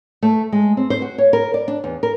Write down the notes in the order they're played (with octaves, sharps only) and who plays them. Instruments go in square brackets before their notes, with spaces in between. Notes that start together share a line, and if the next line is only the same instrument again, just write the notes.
[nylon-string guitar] A3
G#3
C4
C5
F#4
C#5
A#4
D5
D4
E2
A#4